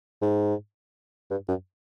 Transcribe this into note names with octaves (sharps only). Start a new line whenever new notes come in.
G#2
G2
F#2